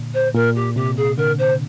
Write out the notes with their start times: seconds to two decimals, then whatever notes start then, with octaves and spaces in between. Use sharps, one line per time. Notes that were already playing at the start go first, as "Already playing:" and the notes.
Already playing: A#2 D3
0.14 C5
0.34 A#2 A#4
0.55 G4
0.76 C3 G4
0.97 G#4
1.17 D3 A#4
1.38 C5